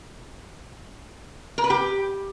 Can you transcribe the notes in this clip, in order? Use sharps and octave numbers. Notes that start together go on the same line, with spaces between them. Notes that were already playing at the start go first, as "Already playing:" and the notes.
A#4
B4
G4